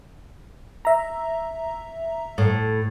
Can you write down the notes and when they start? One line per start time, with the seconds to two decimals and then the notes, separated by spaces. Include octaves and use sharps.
0.85 E5 A#5
2.38 A2